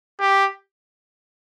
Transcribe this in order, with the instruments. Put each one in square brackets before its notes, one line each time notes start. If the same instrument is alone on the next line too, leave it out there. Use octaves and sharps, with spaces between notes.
[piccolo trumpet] G4